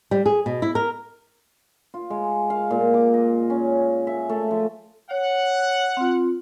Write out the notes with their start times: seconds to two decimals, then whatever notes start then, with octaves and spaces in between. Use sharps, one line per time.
0.11 G3
0.26 G#4
0.46 B2
0.62 E4
0.75 A#4
1.94 F4
2.10 G#3
2.50 F5
2.70 A#2
2.94 D6
3.14 D#5
3.50 C#4
4.07 E5
4.29 A3
4.51 F3
5.11 C#5 F#5
5.97 C4 F4